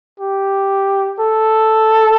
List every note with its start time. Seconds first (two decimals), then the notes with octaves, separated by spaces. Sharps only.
0.20 G4
1.20 A4